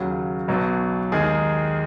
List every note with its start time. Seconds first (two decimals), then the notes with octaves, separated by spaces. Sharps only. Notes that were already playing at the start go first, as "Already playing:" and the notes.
Already playing: D#2 C#3 F#3 F#4
0.48 B1 B2 F#3
1.12 D#2 D#3 G#3 G#4